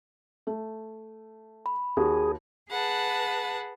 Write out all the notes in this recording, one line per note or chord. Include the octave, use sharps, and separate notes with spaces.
A3
B5
D#2 F#4 G#4
G#4 B4 F#5 A5